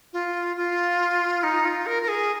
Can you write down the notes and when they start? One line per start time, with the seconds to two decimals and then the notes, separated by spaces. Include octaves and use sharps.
0.13 F4
0.57 F4
1.43 D#4
1.65 F4
1.86 A#4
2.02 A#4
2.08 G#4